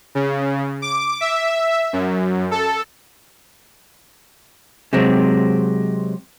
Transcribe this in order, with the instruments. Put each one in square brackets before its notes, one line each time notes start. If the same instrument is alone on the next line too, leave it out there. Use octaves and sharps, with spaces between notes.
[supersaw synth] C#3
D6
E5
F#2
A4
[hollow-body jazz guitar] C3 F#3 G#3 C4